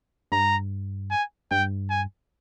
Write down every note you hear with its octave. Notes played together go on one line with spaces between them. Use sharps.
G2 A#5
G#5
G2 G5
G#5